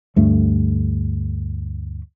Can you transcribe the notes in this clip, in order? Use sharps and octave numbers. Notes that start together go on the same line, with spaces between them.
D2 G2 A3